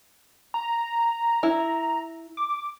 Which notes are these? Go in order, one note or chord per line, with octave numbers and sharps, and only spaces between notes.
A#5
E4
D6